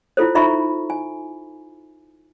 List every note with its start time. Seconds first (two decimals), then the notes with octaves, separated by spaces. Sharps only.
0.17 E4 F4 A4 C5
0.35 D#4 F4 E5 A#5 B5 C#6
0.90 G#5